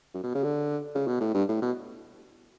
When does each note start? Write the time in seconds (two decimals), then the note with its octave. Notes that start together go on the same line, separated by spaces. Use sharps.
0.14 F#2
0.24 B2
0.35 C#3
0.44 D3
0.95 C#3
1.07 B2
1.21 A2
1.34 G2
1.49 A2
1.62 B2